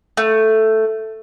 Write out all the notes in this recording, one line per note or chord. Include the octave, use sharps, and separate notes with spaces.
A3